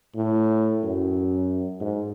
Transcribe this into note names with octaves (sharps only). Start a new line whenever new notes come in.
A2
F#2
G#2